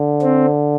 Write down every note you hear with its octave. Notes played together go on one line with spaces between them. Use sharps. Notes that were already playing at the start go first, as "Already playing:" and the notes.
Already playing: D3
C4